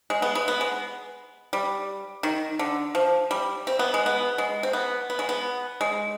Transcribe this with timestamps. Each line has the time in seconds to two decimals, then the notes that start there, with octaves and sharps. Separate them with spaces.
0.10 G#3
0.22 B3
0.35 G#3
0.48 B3
0.61 G#3
1.53 G3
2.23 D#3
2.59 D3
2.95 F3
3.31 G3
3.67 C4
3.79 B3
3.94 G#3
4.06 B3
4.38 G#3
4.63 C4
4.73 B3
5.10 B3
5.19 G#3
5.29 B3
5.81 G#3